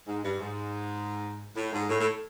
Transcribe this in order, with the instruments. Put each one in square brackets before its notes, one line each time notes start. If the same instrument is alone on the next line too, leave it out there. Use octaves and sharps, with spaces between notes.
[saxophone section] G#2
G2
G#2
A2
G#2
A2
A2